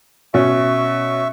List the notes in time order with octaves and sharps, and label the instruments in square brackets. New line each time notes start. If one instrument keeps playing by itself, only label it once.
[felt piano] B2 C#4 [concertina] E5 C#6